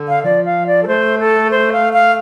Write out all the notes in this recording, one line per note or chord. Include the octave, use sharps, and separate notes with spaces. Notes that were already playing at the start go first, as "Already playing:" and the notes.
Already playing: D3
F5
F3 D5
F5
D5
A4
A3 C5
A4
C5
F5
F5